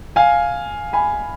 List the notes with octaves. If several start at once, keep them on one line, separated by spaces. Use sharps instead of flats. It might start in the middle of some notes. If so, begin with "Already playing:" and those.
F5 G#5
G#5 B5